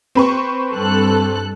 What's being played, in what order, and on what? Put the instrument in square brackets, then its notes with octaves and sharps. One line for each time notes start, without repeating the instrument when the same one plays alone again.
[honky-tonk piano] C4 B4 C#6
[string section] G2 A4 F#6